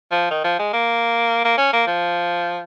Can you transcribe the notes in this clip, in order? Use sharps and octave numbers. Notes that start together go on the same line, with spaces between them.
F3
D#3
F3
G#3
A#3
A#3
C#4
A#3
F3